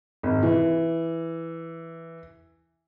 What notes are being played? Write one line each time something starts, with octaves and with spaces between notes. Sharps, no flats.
G#1
E3